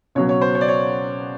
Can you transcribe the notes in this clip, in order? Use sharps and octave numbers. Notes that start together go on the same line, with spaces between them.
C#2 B2 F#3 C#5
C#5
C5
C#5
D5
C#5